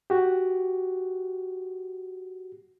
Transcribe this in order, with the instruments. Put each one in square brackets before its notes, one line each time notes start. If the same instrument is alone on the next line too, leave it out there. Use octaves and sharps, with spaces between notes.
[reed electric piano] F#4 G4